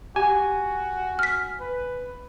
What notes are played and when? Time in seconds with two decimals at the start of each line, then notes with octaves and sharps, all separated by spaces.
0.16 F#4 G4 G#5
1.19 F6 B6
1.60 B4